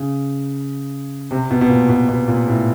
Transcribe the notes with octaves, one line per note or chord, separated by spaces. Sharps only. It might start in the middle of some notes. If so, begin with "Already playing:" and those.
Already playing: C#3
C3
B2
B2
A#2
B2
B2
A#2
A2